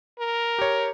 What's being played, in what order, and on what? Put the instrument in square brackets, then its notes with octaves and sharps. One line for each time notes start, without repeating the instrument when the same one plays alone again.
[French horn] A#4
[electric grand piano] G4 C#5